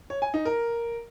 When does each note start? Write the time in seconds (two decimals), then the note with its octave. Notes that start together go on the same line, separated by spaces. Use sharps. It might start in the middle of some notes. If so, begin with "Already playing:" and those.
0.10 C#5
0.22 G#5
0.34 D#4
0.45 A#4